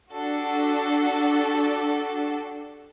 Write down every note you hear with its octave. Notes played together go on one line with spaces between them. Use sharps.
D4 F#4 G4 A4